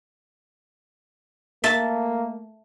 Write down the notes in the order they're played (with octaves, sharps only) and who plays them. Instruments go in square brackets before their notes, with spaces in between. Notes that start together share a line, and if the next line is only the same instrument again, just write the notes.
[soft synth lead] A3 [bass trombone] A#3 [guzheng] E5 A5